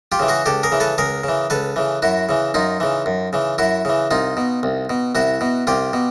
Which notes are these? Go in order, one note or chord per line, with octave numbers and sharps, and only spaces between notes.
F4 G4
C#3 E3
F#4 G#4
C#2 G4 A4
G#4 A#4
C#3 E3
A4 B4
C#2 G#4 A#4
C#3 E3
C#2 A4 B4
C#3 E3
F#2 E4 F#4
C#3 E3
F#2 D#4 F4
C#3 E3
F#2
C#3 E3
F#2 E4 F#4
C#3 E3
C2 D#4 F4
B2
C2
B2
C2 E4 F#4
B2
C2 F4 G4
B2